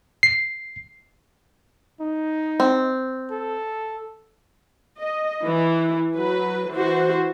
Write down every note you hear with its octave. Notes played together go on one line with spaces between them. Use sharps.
C7
D#4
C4
A4
D#5
E3
F#3 B4
E3 F#4 C5